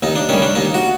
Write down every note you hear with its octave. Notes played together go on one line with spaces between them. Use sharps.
D#2 D#4
D4
D#3 G3 C#4
D4
D#2 D#4
F#4